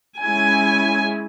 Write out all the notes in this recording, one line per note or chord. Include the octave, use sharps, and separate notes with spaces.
G#3 C#4 E4 G#5